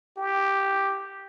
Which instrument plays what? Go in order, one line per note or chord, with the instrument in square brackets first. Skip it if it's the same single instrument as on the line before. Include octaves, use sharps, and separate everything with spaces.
[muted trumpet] G4